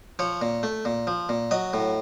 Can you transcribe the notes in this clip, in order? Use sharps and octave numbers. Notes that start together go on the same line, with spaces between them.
F3 C#5
A#2
A3
A#2
F3
A#2
F#3 D#5
A2